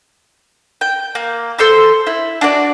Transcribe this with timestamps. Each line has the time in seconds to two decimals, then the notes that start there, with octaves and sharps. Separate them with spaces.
0.81 G5
1.15 A#3
1.58 A4 C5 C6 E6
2.07 E4
2.41 D4 F#4 D5